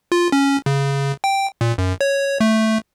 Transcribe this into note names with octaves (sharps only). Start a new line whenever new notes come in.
F4
C#4
C#3
G5
A#2
F#2
C#5
A3